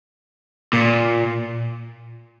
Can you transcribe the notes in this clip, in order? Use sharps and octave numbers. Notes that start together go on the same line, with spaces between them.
A#2